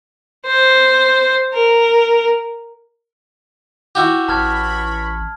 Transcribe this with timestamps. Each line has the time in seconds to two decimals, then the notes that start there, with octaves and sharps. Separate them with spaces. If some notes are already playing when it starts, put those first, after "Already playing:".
0.46 C5
1.54 A#4
3.95 E4 F#4 G4
4.28 A1 E3 C#5 A5 B5 F6 G#6